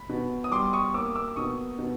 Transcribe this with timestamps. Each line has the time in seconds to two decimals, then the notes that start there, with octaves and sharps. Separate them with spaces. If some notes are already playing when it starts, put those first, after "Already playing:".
Already playing: B5
0.09 B2
0.44 D#6
0.52 G3 C6 D6
0.73 C#6 D#6
0.94 A#3 D6 E6
1.15 D6 E6
1.36 B2 C#6 D#6
1.79 B2